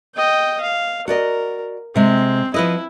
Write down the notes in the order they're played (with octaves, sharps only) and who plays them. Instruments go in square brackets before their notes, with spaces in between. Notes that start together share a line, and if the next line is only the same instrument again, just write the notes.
[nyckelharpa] D#5 G5
F5
[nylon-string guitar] F#4 D5 D#5 [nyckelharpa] A#4
[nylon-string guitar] C3 G#3 [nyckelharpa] C4
[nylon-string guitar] F3 B4 D#5 [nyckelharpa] E4